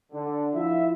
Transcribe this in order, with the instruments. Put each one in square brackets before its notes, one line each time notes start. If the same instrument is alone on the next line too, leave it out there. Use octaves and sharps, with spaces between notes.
[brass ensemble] D3
F3 E4 F4 E5